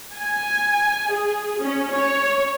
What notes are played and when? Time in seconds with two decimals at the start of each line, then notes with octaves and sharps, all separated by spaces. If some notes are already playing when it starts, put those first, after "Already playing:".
0.17 G#5
1.11 G#4
1.61 C#4
1.95 C#5